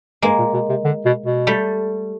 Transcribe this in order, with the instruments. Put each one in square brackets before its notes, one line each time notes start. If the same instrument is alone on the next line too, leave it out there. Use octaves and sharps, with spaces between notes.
[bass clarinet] G2 [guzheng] G#3 A#3
[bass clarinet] A#2
B2
C3
D3
B2
B2
[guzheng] G3 A3